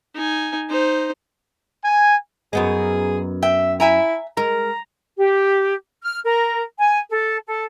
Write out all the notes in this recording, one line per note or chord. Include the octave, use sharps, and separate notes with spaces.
D#4 G#5
D#4 C5
G#5
F#2 B3 D#4 G#4
E5 G5
E4 E5 G#5 A#5
G#3 A#4 A#5
G4
F6
A#4
G#5
A4
A4